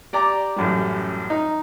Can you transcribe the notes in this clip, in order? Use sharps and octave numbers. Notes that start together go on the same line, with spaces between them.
G4 D5 A#5 D6
A1 F#2 G3
D#4